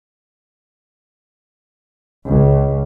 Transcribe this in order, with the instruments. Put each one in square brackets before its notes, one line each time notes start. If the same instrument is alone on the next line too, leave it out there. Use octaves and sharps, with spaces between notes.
[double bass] C#2